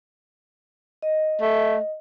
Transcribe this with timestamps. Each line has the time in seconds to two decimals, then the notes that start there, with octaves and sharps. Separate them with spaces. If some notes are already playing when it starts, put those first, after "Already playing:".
1.02 D#5
1.42 A3